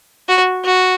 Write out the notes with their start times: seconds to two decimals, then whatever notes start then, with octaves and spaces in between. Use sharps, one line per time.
0.28 F#4
0.65 F#4